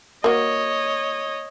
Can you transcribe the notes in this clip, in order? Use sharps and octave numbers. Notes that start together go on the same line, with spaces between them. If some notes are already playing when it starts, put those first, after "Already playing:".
A#3 F#4 C#5 D#5